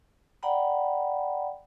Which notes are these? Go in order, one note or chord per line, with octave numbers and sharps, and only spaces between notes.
D5 F#5 G5 A#5 B5